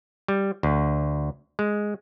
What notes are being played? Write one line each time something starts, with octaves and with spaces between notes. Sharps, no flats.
G3
D2
G#3